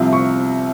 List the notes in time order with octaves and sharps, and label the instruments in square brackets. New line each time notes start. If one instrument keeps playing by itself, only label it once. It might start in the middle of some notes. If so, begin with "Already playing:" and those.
Already playing: [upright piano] C2 C3 F3
C#6